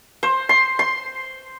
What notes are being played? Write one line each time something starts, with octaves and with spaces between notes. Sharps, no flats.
C5
C6
C6